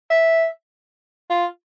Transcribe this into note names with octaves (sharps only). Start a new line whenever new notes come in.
E5
F4